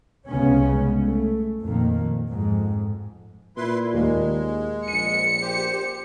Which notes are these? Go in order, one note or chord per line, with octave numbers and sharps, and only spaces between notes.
C2 C#3 G#3 B3 C#4
A3
F2 A#2 D#3 A#3
F2 G#2
A#2 E4 B4 C6
D#2 D#3 G#3 A#3
A#1 C#7 D#7
G4 C5